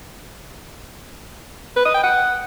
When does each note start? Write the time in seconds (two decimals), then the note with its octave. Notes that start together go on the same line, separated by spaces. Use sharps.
1.76 B4
1.85 D#5
1.94 G5
2.03 F#5